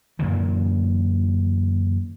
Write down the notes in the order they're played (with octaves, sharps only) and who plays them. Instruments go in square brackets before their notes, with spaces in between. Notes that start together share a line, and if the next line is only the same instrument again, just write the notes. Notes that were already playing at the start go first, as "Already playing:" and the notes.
[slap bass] F#2 A#2 D3 E3